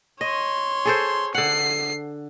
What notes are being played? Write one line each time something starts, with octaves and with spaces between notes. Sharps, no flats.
C#5 D#5 C6
G#4 A4 C5
D3 F#5 C7